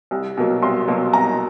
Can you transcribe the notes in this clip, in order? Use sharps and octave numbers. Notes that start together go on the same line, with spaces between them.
C2
B2 F#3 A#3
C2 C6
B2 F#3 A#3
C2 A#5